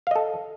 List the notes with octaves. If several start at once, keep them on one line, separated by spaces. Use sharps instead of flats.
A4 D#5 F5